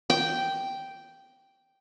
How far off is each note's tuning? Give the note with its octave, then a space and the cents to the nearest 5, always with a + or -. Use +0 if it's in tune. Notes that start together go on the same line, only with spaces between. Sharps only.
G5 -5